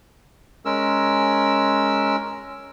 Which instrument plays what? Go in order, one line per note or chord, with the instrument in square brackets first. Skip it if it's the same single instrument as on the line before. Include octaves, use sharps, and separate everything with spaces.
[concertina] G#3 C#4 A#4 E6